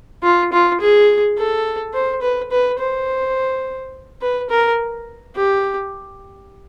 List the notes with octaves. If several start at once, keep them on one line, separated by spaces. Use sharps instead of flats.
F4
F4
G#4
A4
C5
B4
B4
C5
B4
A#4
G4